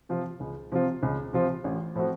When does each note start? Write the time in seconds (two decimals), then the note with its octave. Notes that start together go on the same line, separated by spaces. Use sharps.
0.09 C3 F3 C4 F4
0.40 C#2
0.72 C3 F3 C4 F4
1.03 C#2
1.33 C3 F3 C4 F4
1.64 A1
1.95 A2 F3 C4 F#4